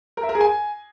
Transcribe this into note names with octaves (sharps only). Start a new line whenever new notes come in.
A#4
E5
A#4
G#4
G#5